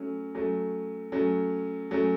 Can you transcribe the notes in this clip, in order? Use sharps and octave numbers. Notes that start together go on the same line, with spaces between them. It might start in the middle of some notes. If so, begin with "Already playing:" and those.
Already playing: F#3 A3 C#4
F#3 A3 C#4
F#3 A3 C#4
F#3 A3 C#4